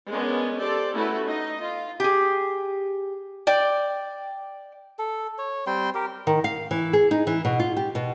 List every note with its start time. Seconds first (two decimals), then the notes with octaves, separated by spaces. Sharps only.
0.10 G#3 B3 C#4 D4 A#4
0.57 G4 A4 C5 D5
0.94 A3 C#4 E4 F#4 A4 B4
1.26 D#4 D#5
1.60 F4
2.00 G4 G#4
3.47 D5 G5
4.99 A4
5.38 C#5
5.67 G3 C4 G5 C6
5.95 G4 A#4
6.27 D#3
6.44 F5
6.71 E3
6.93 G#4
7.11 D#4
7.27 E3
7.45 B2
7.59 F4
7.77 G4
7.95 B2